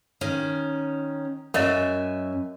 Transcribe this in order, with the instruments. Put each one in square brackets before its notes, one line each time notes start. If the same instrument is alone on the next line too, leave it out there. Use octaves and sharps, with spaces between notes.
[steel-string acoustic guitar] D#3 C#4
[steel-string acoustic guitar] F#2 E5 G#5 [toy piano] A#4 C#5 D#5